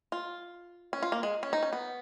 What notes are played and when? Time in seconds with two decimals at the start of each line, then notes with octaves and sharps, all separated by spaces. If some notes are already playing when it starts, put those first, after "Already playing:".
0.12 F4
0.93 C#4
1.03 F4
1.12 A#3
1.23 G#3
1.43 C#4
1.53 D#4
1.63 C#4
1.73 B3